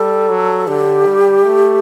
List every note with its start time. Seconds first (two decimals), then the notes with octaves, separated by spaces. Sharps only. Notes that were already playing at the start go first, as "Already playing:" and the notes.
Already playing: G3 A4
0.29 F#3
0.67 D3 G4
1.06 G3
1.45 A3